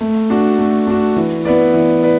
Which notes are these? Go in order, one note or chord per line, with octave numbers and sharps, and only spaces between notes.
A3
D4 F#4
A3
D4 F#4
E3
B3 E4 B4 D5
E3
B4 D5